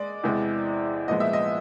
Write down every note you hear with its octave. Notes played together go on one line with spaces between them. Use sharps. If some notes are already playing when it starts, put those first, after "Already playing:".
Already playing: G#3 D5
E2 C3 E3 G#3
C2 A#2 F3 G#3 B3 D#5
E5
D#5